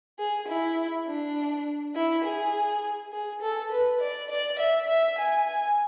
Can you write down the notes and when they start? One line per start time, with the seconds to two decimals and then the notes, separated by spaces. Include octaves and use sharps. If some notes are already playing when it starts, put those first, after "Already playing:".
0.19 G#4
0.48 E4
1.07 D4
1.95 E4
2.25 G#4
3.12 G#4
3.42 A4
3.71 B4
4.01 D5
4.30 D5
4.59 E5
4.88 E5
5.19 G#5
5.48 G#5